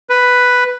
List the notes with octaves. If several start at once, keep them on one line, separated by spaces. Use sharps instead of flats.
B4